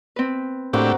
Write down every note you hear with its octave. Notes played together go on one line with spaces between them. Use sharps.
C4 B4
A2 A#3 C4 D4 F#4 G4